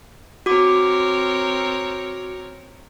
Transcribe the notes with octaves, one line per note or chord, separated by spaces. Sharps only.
C4 F#4 A#4 C#5 D6